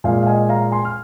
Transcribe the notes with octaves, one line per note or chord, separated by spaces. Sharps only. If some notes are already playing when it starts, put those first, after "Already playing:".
A#2 G#3 F5
F5
D#5 G#5
F5 A#5
G#5 C6
F6